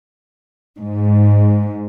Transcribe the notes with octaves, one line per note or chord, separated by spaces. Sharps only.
G#2